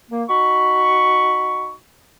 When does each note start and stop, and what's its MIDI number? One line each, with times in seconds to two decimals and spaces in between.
0.11 0.23 58
0.29 1.74 63
0.29 1.74 66
0.29 1.74 83
0.29 1.74 85